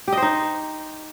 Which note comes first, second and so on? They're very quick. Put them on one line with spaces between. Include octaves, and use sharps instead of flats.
G4 D#5 C5 D#4